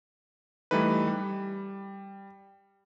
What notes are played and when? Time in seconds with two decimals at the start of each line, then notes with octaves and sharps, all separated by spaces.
0.71 E3 G3 A3 D#4 B4
1.07 G3